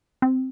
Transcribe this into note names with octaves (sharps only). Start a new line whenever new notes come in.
C4